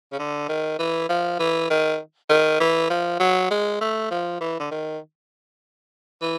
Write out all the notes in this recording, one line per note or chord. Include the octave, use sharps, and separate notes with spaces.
C#3
D3
D#3
E3
F3
E3
D#3
D#3
E3
F3
F#3
G#3
A3
F3
E3
D3
D#3
E3